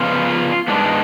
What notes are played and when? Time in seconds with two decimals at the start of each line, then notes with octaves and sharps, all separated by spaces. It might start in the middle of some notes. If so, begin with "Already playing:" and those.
Already playing: C#3 F3 B3 F4
0.68 G#2 G#3 B3 D4